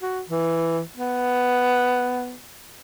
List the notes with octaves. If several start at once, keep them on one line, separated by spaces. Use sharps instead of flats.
F#4
E3
B3